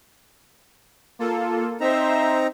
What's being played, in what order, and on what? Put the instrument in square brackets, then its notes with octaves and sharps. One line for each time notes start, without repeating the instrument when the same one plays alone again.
[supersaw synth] A#3 F4 A4
[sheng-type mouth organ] C4 D#4 A#5 [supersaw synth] C5 E5